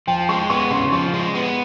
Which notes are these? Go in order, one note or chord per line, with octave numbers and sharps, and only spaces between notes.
F3 G5
G#3 C#6
B3 C#6
C#3 C6
F3 C#6
G#3
B3